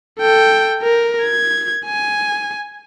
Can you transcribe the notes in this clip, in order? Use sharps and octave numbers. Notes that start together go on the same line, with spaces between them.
A4 G5
A#4
G#6
G#5